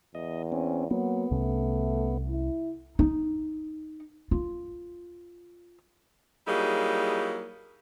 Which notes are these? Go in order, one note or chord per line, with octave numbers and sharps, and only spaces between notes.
E2 D#5
C4 C#4
F#3 A#3 B3
C2 C3 A3 C#4
E4
D#4
F4
F#3 G3 A#3 D#4 E4 G#4